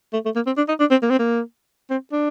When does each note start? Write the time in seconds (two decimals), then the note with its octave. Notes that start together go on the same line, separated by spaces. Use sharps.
0.13 A3
0.25 A3
0.36 A#3
0.47 C4
0.57 D4
0.68 D#4
0.80 D4
0.91 C4
1.02 A#3
1.10 C4
1.19 A#3
1.90 C4
2.12 D4